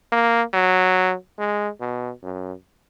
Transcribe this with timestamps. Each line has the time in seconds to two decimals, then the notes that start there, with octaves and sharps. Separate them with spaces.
0.12 A#3
0.53 F#3
1.39 G#3
1.80 B2
2.23 F#2